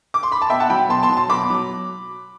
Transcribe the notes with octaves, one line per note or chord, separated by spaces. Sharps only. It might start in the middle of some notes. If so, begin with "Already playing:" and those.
D6
C6
B5
A5
B2 E5 G5
F#5 A5
F#3 G5 B5
B2 A5 C6
A5 C6
F#3
A5 C6
B2 B5 D6
F#3